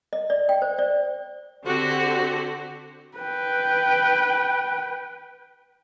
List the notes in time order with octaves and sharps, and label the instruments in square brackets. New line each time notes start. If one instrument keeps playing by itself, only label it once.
[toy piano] D#5
D5
G5
C5
D5
[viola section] D3 C4 F#4 G4
[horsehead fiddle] B4 G5